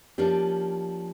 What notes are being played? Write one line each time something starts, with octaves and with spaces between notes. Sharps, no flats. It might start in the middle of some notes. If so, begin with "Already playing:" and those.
F3 A#3 C#4 D4 G4